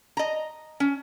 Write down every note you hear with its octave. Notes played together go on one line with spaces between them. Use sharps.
D#5 A#5
C#4